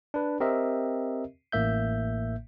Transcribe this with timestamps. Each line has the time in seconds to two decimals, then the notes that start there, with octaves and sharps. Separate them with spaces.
0.14 D4 B4
0.40 C4 G4 A#4 D#5 E5
1.52 A1 A2 A#3 E5 G6